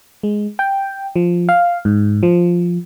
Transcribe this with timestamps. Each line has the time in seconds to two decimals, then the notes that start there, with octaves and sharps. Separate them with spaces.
0.23 G#3
0.59 G5
1.16 F3
1.49 F5
1.85 G#2
2.23 F3